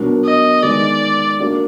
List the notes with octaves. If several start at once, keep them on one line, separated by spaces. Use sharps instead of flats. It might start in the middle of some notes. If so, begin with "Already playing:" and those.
Already playing: B2 F#3 D4 F#4 A#4
D#5
D#3 G#3 B3 D5
A#3 D4 F#4 D5